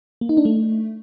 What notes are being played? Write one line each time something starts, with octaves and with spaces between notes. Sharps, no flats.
A#3
D#4
D4
A3